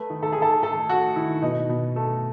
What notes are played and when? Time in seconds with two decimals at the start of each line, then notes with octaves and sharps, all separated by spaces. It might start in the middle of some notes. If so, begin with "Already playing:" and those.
Already playing: A3 B4
0.10 D#3
0.23 A4
0.32 D#3 G#4
0.42 A4
0.62 A3 A4
0.89 A3 F#4
1.16 D#3 E4
1.42 B2 D#4
1.69 B2
1.96 A3